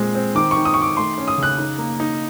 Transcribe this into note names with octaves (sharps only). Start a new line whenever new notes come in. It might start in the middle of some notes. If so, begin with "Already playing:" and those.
Already playing: A#2 G#3 C4
C4
D#3 D6
C#6
D#3
D#6
C#6
D#3
D6
A3 C6
C#4
D#6
C#3 F#6
D#4
A#3
D#4